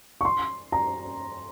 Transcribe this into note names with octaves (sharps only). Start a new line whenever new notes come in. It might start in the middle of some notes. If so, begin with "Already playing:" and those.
C#6
C6
A#5